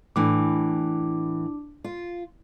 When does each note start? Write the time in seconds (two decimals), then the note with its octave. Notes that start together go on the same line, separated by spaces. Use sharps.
0.16 A2 E3 D4 D6
1.84 F4